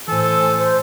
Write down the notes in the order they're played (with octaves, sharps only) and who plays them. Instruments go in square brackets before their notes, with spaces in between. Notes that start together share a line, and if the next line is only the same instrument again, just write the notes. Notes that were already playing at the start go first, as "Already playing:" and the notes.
[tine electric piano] A2 E3 [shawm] A4 [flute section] C5 G#5
[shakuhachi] C5